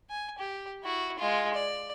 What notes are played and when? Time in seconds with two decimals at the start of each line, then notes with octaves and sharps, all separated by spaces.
0.10 G#5
0.39 G4
0.83 E4 F#4
1.18 G#3 F4
1.54 D5